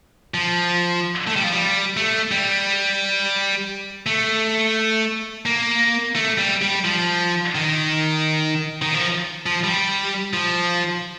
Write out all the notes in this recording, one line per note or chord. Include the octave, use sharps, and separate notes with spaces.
F3
A3
G3
F3
G3
A3
G3
A3
A#3
A3
G3
G3
F3
D#3
D#3
F3
F3
G3
F3